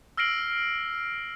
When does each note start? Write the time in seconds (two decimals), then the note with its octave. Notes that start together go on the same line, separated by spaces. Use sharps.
0.17 E6 F6 A#6 C7 D7 F#7